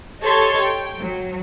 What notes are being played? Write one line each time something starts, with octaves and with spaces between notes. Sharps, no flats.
G4 A4 C#5 D#5 A5 C6
G5
F#3